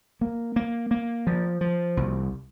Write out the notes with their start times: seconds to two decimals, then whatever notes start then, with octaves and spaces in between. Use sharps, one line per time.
0.21 A#3
0.56 A#3
0.91 A#3
1.27 F3
1.61 F3
1.97 C2